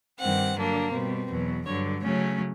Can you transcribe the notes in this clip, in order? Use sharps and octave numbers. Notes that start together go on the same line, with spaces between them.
G2 D#3 G3 C4 F#5
D3 F#3 A#3 D4
B2 G3 C4
E2 B2 F#3
G2 D3 F#3 C#5
C#3 F#3 A3 C#4